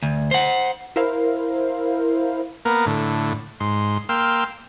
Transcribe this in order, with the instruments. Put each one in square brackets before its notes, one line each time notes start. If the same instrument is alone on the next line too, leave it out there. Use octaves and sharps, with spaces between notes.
[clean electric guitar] D2
C5 F#5
[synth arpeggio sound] E4 A#4 C5 F5
[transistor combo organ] A#3 B3 A#4
A2 D3
G#2 C6
A#3 G5 C6 E6 F6